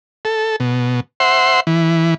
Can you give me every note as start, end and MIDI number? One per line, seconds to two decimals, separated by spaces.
0.25 0.56 69
0.60 1.00 47
1.20 1.60 72
1.20 1.60 76
1.20 1.60 78
1.20 1.60 84
1.67 2.14 52